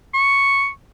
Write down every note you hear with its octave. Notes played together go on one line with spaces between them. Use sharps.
C#6